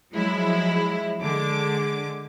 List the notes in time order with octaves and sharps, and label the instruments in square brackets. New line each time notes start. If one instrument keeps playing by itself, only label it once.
[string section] F3 F#3 G#3 E4
D3 G#3 D6